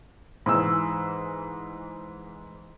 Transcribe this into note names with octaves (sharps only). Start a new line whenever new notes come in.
G#2 E3 E6